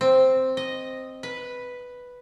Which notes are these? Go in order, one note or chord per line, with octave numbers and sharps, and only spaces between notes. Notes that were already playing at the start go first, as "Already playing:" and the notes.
C4
D#5
B4